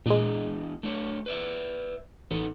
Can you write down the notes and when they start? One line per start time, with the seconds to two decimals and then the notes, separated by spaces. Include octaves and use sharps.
0.06 E2 A#2 G#3 D4 D#5
0.83 A3 D4 C#5
1.26 B4 D5 E5
2.31 A1 B3 D#4 A4